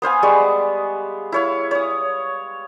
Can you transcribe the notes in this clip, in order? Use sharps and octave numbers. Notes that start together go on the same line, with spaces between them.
B3 C5 F5 G#5
G3 G#3 B3 C#6
E4 C#5 F5
C#5 D#6